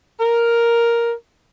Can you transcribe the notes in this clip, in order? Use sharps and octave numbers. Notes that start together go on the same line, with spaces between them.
A#4